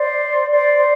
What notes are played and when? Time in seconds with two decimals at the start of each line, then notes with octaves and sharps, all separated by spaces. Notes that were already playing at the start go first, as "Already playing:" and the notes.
Already playing: C5 D5
0.50 C5 D5
0.78 C5